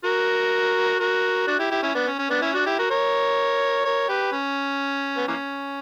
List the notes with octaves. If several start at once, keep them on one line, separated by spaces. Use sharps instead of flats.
F#4 A#4
F#4 A#4
D4 F#4
E4 G4
E4 G4
C#4 E4
B3 D4
C#4
C#4
B3 D4
C#4 E4
D4 F#4
E4 G4
F#4 A#4
A#4 C#5
A#4 C#5
G4 B4
C#4
B3
E3 A#3 C#4